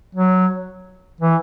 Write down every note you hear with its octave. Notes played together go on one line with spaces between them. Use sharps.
F#3
E3